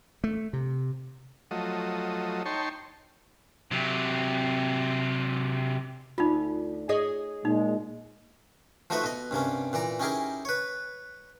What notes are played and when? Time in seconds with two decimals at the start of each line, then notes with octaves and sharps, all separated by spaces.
0.24 A3
0.53 C3
1.51 F3 F#3 A3 D#5
2.46 D#4 C#5 G5 A5 C6 C#6
3.71 C3 F#3
6.18 D2 D#4 F4
6.89 G#4 C#5 D#5
7.45 A#2 G#3 D#4
8.90 F3 A3 D#4 F#4 B4 E5
9.04 B2 D#5
9.31 G2 C3 A#3 C#4
9.73 A#2 E3 D5 A#5
10.00 C#4 D#4 E4 G4 G#4 A#4
10.45 B4 C#5